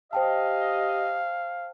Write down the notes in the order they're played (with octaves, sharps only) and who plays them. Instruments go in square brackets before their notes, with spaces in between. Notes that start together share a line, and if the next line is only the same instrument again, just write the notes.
[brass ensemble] G4 D#5 [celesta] C5 G5 A5 [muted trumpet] F5